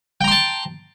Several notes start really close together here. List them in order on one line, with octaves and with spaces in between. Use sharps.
G5 A#5 C6 A5